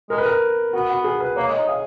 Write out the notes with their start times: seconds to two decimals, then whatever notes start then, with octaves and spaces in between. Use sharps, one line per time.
0.10 G#3 A#4
0.18 B4
0.26 A#4
0.73 B3 F#4
0.90 F#4
1.04 G#4
1.20 B4
1.36 A#3 C#5
1.47 G#3
1.52 D#5
1.58 D#4
1.68 G#4 F5